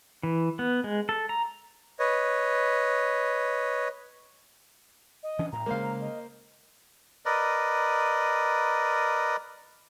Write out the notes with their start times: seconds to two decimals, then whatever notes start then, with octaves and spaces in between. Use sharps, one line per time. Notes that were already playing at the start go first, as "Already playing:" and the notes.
0.23 E3
0.59 B3
0.84 G#3
1.09 A4
1.29 A#5
1.99 B4 C#5 D#5
5.23 D#5
5.39 E3 C#4 D4
5.52 A2 A#5
5.66 C#3 G#3 A#3 C5 F5
5.82 A#5
6.01 D#5
7.26 A#4 B4 D5 D#5